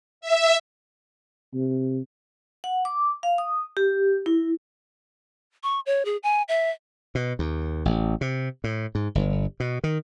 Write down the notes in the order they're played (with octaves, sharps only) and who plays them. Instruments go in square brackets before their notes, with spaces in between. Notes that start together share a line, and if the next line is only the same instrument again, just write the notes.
[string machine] E5
[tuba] C3
[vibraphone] F#5
D6
F5
D#6
G4
E4
[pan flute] C#6
C#5
G#4
G#5
E5
[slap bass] B2
D#2
A1
C3
A2
G#2
G1
B2
D#3